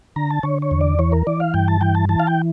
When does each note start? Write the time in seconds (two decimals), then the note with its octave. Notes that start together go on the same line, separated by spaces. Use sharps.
0.16 D3 A#5
0.31 A5
0.43 D3 C#5
0.62 C#5
0.71 E2
0.81 D5
0.99 E3 C#5
1.12 A#4
1.27 E3 D5
1.40 F5
1.54 G2 G5
1.68 A5
1.81 E3 G5
1.95 A5
2.09 E3 A5
2.20 F5
2.27 G5